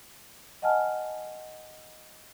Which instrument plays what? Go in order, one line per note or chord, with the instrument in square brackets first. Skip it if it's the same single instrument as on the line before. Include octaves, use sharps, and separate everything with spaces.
[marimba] D#5 F#5 G#5 A5 F6